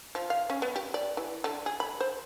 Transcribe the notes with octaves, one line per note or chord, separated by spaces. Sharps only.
F3
F5
C#4
B3
G4
D5
E3
D3
G#4
B5
C5